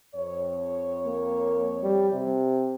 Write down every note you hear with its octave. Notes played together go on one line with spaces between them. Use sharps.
F2 C#5
A#3
G3
C3